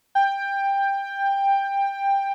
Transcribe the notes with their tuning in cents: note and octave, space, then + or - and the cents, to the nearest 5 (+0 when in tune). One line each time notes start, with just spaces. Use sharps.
G5 +15